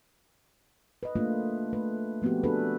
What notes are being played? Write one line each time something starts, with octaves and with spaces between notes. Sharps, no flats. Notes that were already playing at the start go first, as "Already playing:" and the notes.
B4 D#5
A3 A#3 D4 F4
A3 B4
F3 A3 B3 C4 F#4 G4
D4 F#4 G#4 A4 B4